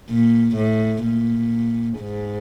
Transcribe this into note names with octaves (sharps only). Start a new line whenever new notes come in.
A#2
A2
A#2
G#2